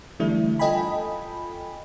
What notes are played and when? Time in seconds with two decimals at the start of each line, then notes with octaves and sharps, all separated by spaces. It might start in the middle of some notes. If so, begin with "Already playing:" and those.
0.20 D3 E3 G3 A3 D4 E4
0.59 F4 A4 D#5 G5 G#5 B5